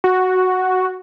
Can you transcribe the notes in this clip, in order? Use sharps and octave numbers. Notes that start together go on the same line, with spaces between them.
F#4